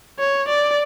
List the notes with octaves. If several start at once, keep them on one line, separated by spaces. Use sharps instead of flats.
C#5
D5